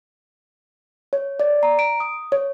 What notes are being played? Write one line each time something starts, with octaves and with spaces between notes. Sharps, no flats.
C#5
D5
A#5
D7
D#6
C#5